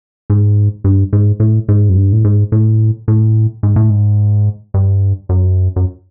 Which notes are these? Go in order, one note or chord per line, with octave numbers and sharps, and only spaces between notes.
G#2
G2
G#2
A2
G#2
F#2
G2
A2
G#2
A2
A2
G#2
A2
G#2
G2
F#2
F#2